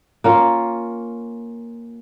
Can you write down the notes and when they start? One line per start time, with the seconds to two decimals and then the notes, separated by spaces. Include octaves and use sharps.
0.24 A#3 C#4 F4